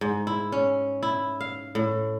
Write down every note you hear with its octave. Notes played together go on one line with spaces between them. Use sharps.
G#2
E4
C#4
E4
F5
A2